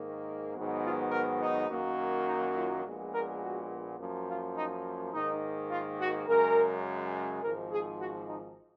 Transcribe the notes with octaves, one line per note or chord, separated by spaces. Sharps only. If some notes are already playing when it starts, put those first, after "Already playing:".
Already playing: G#2 D#3 A#3
G#2 D#3 F#3 B3
F4
A#4
D#4
F#2 D#3 F#3 A#3
D#4
F4
A#1 A#2 G#3 B3
A#4
F#4
F#2 F3 A#3
F4
D#4
G#2 D#3 A#3 D#4
F4
F#4
F#2 C#3 G#3 A#4
G#1 G#2 F3 A#4
G#4
F#4
D#4